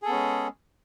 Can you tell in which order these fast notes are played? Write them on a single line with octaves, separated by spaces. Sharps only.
G#4 A4 B3 C#4 G#3